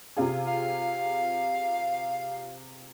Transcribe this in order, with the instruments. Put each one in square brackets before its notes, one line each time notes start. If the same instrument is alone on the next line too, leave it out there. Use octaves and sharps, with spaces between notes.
[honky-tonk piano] C3 F4 G#4
[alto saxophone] F5